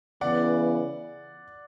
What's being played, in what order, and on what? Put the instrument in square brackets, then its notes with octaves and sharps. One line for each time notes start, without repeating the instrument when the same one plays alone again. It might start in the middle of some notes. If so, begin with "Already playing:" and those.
[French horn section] C#3 E3 B3 [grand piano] D5 F#5